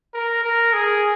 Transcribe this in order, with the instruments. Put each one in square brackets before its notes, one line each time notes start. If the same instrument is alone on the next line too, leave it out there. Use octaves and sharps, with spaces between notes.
[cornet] A#4
A#4
G#4